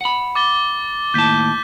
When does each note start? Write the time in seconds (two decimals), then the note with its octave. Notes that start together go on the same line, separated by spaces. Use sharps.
0.01 F#5 B5
0.35 D6 A6 G7
1.14 D#2 A2 A5 G6 B6